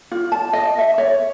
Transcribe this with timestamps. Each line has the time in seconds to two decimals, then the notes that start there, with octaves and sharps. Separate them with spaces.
0.11 F4
0.32 A5
0.53 D#5
0.78 E5
0.98 C#5